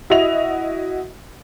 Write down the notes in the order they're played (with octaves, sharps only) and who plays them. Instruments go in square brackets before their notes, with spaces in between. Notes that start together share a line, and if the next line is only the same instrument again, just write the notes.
[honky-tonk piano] E4 F#4 D#5 F7